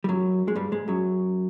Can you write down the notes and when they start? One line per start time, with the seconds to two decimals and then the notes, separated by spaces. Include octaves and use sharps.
0.04 G3
0.09 F#2 F#3
0.48 G#3
0.56 G2 G3
0.72 G#2 G#3
0.88 F#2 F#3